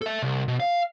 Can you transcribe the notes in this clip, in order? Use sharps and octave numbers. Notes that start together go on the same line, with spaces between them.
A4 E5
C2
B2
F5